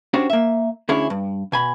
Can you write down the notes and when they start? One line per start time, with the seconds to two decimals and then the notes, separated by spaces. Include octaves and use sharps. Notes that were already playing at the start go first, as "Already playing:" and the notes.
0.14 C#4 D4 F#4 G4 C5
0.30 A#3 E5
0.89 D2 C#4 D4 E4 G#4 C#5
1.10 G2
1.52 B2 G#5 B5